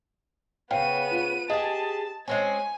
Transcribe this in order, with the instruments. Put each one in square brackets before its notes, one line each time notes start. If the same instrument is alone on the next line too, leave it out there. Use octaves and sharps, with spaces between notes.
[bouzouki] C#3 [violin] B3 D#7 [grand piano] F5 G5
[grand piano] F4
[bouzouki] G4 G#4 [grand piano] D#5 [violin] A5
[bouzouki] G#3 C4 C#4 [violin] G#5